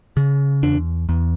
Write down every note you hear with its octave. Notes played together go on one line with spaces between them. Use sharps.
C#3
E2 D4
E2